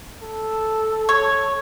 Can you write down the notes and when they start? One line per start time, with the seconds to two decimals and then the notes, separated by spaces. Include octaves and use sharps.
0.23 A4
1.09 C#5